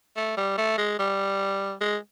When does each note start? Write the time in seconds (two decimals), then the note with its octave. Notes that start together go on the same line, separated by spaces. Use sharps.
0.16 A3
0.37 G3
0.57 A3
0.78 G#3
0.98 G3
1.81 G#3